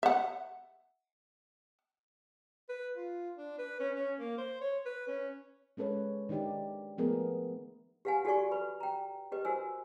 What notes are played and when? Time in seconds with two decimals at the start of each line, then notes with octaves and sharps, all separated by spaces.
0.03 E5 F#5
2.69 B4
2.97 F4
3.37 D4
3.59 B4
3.80 C#4
3.96 C#4
4.19 A#3
4.38 C5
4.61 C#5
4.86 B4
5.08 C#4
5.77 G#3 C#4 A4 B4 C#5
6.29 D#3 D4 D#4 G4 D5
6.98 F3 A3 B3 G#4 A#4
8.05 G4 B4 F5 F#5 G#5
8.25 F#4 G4 A4 D5 G#5 C#6
8.52 B4 B5
8.80 G5 A#5
9.32 G4 B4 D#5
9.45 F#4 A#4 C5 G#5 E6